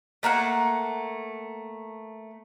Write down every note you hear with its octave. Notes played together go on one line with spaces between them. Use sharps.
A3 A#3 F5 F#5